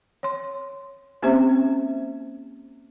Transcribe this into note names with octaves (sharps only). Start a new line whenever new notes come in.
C#5 C6
A#3 C4 C#4 G4 C5 E5